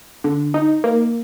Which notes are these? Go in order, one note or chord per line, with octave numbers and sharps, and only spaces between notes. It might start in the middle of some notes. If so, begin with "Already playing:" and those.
D3
D#4
A#3